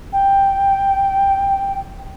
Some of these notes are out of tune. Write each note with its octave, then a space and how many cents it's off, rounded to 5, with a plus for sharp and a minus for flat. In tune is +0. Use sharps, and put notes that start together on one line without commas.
G5 +5